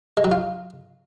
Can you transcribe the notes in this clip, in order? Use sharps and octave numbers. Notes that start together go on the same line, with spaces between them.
G#3
F#3
F4